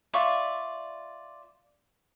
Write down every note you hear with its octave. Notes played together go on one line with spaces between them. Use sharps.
F4 D5 E5 C#6